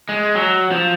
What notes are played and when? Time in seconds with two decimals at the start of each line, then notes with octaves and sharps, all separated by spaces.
0.09 G#3
0.35 F#3
0.72 F3